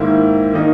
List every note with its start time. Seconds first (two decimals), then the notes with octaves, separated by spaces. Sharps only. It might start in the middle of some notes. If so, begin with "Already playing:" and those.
Already playing: G#2 D#3 A#3 E4
0.53 D#3 A#3 D#4